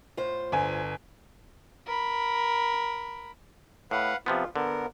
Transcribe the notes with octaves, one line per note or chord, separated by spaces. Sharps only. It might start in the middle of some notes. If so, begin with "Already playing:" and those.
A2 F4 C5
G1 G#5
A#4 B5
A2 B4 F5 F#5
C3 F3 B3 F4
D3 B3 A#4